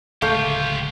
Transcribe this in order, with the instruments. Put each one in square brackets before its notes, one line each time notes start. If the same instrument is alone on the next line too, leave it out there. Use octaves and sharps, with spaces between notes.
[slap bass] D1 C#2 [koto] A3 [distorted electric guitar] F4 G4 [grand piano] F5 C#6 G6